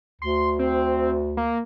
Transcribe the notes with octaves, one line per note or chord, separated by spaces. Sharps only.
D2 C6
C4
A#3